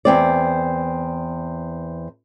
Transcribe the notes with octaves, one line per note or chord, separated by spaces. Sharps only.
E2 C4 D5